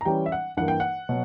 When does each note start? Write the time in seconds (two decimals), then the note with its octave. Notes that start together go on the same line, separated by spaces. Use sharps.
0.01 A#5
0.05 E3 G3 C#4 G4 G5
0.26 E5
0.32 F#5
0.57 G2 E3 A#3 F#5
0.68 G5
0.80 F#5
1.09 B2 F#3